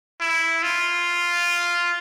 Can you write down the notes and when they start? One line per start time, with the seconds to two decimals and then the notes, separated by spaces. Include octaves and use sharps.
0.20 E4
0.63 F4